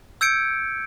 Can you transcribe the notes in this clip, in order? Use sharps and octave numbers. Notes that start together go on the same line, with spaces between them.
E6 G6 G#6 C#7 D7